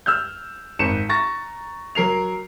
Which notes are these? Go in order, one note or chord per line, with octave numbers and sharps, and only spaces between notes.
E6 F6 G6
G#1 C#7 E7
A#5 C#6 A6 A#6
F#3 A#4 C7 F7